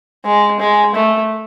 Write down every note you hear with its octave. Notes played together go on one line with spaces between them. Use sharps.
G#3
G#3
A3